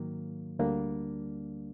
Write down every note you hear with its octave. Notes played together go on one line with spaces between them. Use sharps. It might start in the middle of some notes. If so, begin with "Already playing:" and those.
Already playing: G#2 D#3 F#3 A#3
D2 D3 G3 A#3 D4